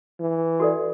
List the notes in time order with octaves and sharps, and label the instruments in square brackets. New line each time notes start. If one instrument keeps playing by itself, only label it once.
[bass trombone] E3
[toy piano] F#4 A4 D5